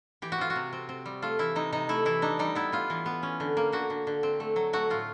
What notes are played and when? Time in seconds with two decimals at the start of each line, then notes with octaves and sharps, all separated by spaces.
0.22 E3 G4
0.32 F#4
0.38 C4 F4
0.50 F#4
0.56 C3
0.73 C4
0.89 C4
1.06 G3
1.22 A3 F4
1.39 E3 E4
1.55 C3 D#4
1.72 C3 D#4
1.89 A3 E4
2.05 E3 E4
2.22 D4 D#4
2.39 G3 D#4
2.55 B3 E4
2.72 B3 F4
2.90 E3
3.06 B3
3.23 C#4
3.40 D3
3.57 A#3
3.72 D3 F#4
3.90 D3
4.07 D3
4.23 C4
4.40 A3
4.56 F#3
4.73 A3 F#4
4.90 A2 F4